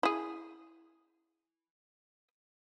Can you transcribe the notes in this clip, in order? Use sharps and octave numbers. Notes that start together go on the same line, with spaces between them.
E4 G#4